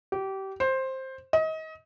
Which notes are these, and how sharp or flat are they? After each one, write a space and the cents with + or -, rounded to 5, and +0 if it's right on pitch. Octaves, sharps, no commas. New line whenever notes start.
G4 -25
C5 +10
D#5 +30